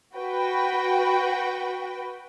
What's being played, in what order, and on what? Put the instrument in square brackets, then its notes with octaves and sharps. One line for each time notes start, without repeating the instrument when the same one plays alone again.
[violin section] F#4 B4 G5